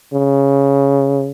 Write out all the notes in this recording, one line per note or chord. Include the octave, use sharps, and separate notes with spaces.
C#3